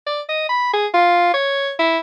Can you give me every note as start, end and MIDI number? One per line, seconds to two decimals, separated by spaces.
0.07 0.21 74
0.29 0.48 75
0.49 0.71 83
0.73 0.87 68
0.94 1.33 65
1.34 1.73 73
1.79 1.98 64